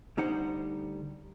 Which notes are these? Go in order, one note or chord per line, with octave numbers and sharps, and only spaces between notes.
D2 G3 D#4 C5 F#5